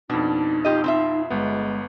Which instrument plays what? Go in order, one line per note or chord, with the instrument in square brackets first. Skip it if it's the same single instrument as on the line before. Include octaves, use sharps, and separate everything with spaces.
[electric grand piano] F2 B2 [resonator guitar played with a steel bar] D4 [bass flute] D#4
[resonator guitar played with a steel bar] F4 G4 D#5
C4 F4 E5
[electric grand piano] G1 B3 [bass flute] G#3